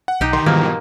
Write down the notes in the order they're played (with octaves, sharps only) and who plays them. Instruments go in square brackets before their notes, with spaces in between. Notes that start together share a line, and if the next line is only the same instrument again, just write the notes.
[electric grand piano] F#5
[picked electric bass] B1 [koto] D#4 G4
[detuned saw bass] D#3 [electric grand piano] C6
[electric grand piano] G#2 B2 F3 [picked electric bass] E3 G3 [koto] A#3